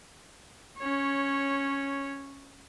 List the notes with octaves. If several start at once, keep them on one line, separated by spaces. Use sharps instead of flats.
C#4 C#5